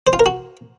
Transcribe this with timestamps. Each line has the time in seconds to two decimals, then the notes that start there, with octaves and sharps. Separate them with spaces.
0.07 C5
0.13 F4
0.19 A#4
0.26 F#4